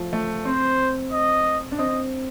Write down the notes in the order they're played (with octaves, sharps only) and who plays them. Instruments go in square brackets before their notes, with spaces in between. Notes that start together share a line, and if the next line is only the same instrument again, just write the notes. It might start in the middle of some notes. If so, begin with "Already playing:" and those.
Already playing: [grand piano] F3 A3
A3
[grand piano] C4 [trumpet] C5
[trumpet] D#5
[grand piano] D4
[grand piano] C4 [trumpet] D#5